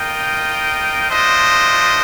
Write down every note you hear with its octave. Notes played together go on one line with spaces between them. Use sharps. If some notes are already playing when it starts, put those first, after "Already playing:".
Already playing: F4 A#4 D#5 G5
A3 D4 F4 C5 D#5